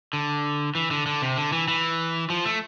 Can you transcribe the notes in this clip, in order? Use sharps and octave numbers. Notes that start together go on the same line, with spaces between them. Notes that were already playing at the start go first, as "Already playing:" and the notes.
D3
E3
D3
D3
C3
D3
E3
E3
F3
A3